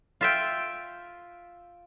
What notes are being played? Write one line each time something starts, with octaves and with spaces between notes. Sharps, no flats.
F4 E5 G5